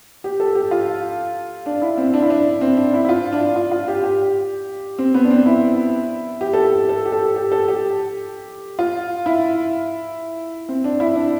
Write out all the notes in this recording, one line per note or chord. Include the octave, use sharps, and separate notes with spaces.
G4
A4
G4
F4
D4
E4
C4
D4
E4
D4
C4
D4
E4
E4
F4
D4
F4
F4
G4
G4
C4
B3
D4
C4
E4
G4
A4
G4
A4
G4
A4
G4
A4
G4
F4
E4
C4
D4
E4
D4